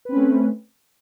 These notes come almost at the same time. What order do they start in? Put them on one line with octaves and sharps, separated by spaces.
B4 C4 C#4 A3